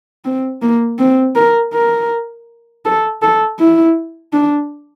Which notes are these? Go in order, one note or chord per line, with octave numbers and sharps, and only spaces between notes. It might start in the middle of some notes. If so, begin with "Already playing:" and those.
C4
A#3
C4
A#4
A#4
A4
A4
E4
D4